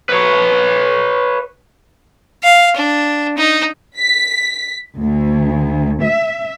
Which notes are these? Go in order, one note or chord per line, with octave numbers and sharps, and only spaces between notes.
B4 C#5
F5
D4
D#4
B6
D2
E5